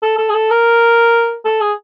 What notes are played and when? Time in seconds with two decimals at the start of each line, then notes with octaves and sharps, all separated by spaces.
0.03 A4
0.18 A4
0.30 G#4
0.34 A4
0.50 A#4
1.45 A4
1.61 G#4